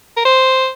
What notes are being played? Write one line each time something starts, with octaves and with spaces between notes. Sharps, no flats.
A#4
C5